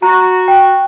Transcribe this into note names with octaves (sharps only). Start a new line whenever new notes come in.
F#4 A#5
G5